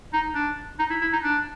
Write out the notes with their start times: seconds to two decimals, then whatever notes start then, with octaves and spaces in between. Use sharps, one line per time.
0.13 D#4
0.35 D4
0.79 D#4
0.90 E4
1.01 E4
1.13 D#4
1.24 D4